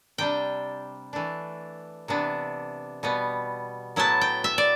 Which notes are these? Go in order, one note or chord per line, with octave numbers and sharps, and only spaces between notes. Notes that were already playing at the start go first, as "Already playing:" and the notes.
C3 G3 D4 G5
E3 A3 D4
C3 E3 B3 D4
B2 G3 B3
A2 F#3 B3 E4 A5
G5
E5
D5